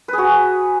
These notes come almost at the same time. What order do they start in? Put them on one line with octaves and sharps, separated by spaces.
B4 G#4 F#4